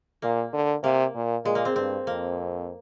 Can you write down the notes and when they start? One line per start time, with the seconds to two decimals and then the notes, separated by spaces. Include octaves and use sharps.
0.22 A#2 A#3
0.53 D3
0.83 C3 A#3
1.15 A#2
1.45 A#2 G#3
1.55 A#3
1.65 C4
1.76 G2 C4
2.07 F2 A#3